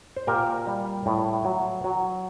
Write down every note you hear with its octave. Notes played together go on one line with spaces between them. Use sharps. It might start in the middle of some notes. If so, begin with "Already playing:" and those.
C5
A#2 G4 A#4
G3
A2
F#3
F#3